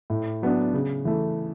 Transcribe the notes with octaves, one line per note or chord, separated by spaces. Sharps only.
A2
F#3 B3 D4
C#3
E3 A3